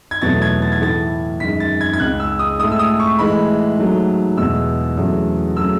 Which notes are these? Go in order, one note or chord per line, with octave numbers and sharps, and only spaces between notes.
G#6
E2 B2 F#3 A3 A6
G#6
A6
G#6
A2 E3 A3 A6
F#2 D#3 G#3 B6
A6
G#6
G#6
C#2 C#3 G#3 F#6
E6
D#6
A2 G#3 D#6
E6
D#6
C#6
A2 E3 G#3 B5
G#2 F#3 A3
E2 B2 G#3 E6
E2 C#3 F#3 A3
C#3 F#3 A3 E6